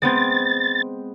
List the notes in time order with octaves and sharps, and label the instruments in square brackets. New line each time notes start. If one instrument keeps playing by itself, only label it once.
[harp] G#3 B3 C4 [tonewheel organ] A6